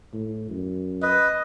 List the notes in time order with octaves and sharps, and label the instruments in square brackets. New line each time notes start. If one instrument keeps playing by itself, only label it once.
[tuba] A2
F#2
[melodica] B4 [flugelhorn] D#5